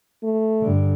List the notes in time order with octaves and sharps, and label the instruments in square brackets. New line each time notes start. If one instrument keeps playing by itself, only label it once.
[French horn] A3
[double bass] G2 D3